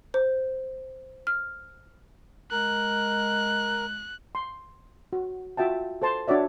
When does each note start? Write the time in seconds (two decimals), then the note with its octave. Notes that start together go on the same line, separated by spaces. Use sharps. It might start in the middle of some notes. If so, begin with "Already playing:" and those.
0.14 C5
1.27 F6
2.52 G#3 A#4 F#6
4.35 C6
5.13 F#4
5.57 F4 F#4 E5 G5 A5
6.02 A4 C5 A5 C6
6.28 D4 F#4 C#5 D5 E5